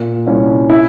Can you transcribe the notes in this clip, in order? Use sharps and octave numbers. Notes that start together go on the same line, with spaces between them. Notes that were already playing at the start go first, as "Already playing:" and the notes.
Already playing: A#2
C2 C#4
E4